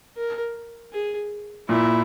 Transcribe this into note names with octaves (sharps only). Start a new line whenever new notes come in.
A#4
G#4
A#2 E4